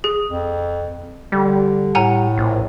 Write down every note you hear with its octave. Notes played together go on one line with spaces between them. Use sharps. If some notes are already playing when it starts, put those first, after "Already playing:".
G#4
F2
D3 G3
A2 F#5 G#5 A#5
A#1